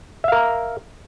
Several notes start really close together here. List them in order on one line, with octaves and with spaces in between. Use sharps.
E5 F5 A#4 A#5